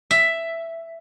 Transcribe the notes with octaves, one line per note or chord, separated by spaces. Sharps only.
E5